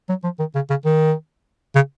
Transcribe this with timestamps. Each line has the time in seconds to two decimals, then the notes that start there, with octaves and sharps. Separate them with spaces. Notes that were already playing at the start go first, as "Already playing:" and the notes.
0.09 F#3
0.24 F3
0.39 D#3
0.55 C#3
0.70 C#3
0.85 D#3
1.75 C#3